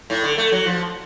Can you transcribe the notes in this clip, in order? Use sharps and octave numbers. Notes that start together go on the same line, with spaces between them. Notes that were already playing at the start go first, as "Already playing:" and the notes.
A2
D3
A3
F#3
F3